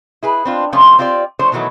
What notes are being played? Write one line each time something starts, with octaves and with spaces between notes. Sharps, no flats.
E4 G#4 B4
C4 D4 F4
C3 F3 A3 C#4 F4
C4 F4 G4 A#4 D5
F3 A3 D4 C5 C#5
B2 D#3 E3 F#3 A3